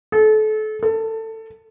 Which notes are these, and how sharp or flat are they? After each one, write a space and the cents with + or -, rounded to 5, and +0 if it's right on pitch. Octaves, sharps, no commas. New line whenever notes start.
A4 -30
A4 +20